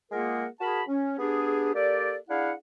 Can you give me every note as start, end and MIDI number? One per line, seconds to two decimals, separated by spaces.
0.12 0.45 56
0.12 0.45 58
0.12 0.45 65
0.12 0.45 68
0.12 0.45 70
0.12 0.45 78
0.61 0.82 66
0.61 0.82 68
0.61 0.82 70
0.61 0.82 81
0.61 0.82 83
0.87 1.17 61
1.19 1.70 59
1.19 1.70 62
1.19 1.70 67
1.19 1.70 68
1.74 2.15 58
1.74 2.15 67
1.74 2.15 69
1.74 2.15 74
2.29 2.52 62
2.29 2.52 64
2.29 2.52 68
2.29 2.52 77
2.29 2.52 78